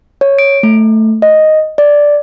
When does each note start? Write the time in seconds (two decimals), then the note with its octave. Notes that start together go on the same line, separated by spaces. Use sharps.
0.21 C#5
0.39 D7
0.63 A3
1.22 D#5
1.78 D5